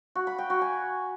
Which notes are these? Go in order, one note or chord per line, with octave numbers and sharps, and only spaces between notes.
F#4
B5
G5
F#4
G#5